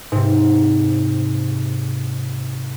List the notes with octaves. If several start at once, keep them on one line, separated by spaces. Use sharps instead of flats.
G#2 C3